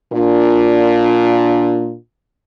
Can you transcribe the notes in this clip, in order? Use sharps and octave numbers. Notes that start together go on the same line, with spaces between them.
A#2 D4 F4